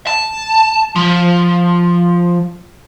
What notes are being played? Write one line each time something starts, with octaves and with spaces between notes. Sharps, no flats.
A5
F3